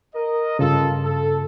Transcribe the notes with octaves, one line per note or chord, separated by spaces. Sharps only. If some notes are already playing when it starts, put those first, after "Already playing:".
A#4 D#5
G2 C#3 F4 A4
A4